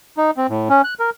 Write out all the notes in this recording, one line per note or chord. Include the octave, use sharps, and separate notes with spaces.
D#4
C4
A2
C#4
F#6
A#4